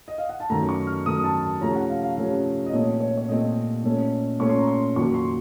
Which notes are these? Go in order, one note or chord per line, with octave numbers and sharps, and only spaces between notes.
D#5
F5
F#5
A5
F#2 D#3 A3 A#5
C#6
F6
F#2 D#3 A3 D#6
A5
A5
C3 F3 A3 C#4 A#5
F#5
F5
F5
C3 F3 A3 C#4
D#5
A#2 A3 C4 C#5
C#5
C#5
A#2 A3 C4 D#5
A#2 A3 C#4
A#2 A3 C#4 C#6
C6
A#5
C6
F2 D#3 F#3 A#3 C#6
C6